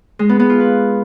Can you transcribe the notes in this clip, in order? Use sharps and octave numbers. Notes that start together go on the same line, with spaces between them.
G#3
B3
B3
F4
B4